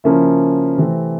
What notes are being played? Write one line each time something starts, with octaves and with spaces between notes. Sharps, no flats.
C#3 F3 A#3 C#4 E4
C3 E3 A3 C4